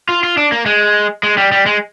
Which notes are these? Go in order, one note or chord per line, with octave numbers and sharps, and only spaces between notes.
F4
F4
D4
A#3
G#3
G#3
G3
G3
G#3